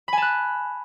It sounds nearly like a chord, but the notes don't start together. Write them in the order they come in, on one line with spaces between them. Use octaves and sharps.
B5 G#5 A5 F#6